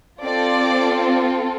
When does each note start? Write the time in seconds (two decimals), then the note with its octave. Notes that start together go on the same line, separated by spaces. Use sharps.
0.22 C4 F4 A4 D5